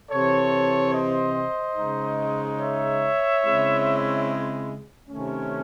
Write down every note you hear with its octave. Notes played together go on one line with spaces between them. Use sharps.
C3 E3 C4 A4 C#5
C5 D#5
C#3 G#3 D#4
C#5 E5
C#3 G#3 C4 E4
C3 D#3 A3 C#4